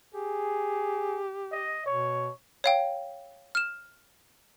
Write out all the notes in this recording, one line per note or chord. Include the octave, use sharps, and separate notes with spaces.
G4 G#4
D#5
B2 C#5
C#5 F5 G5
F6 E7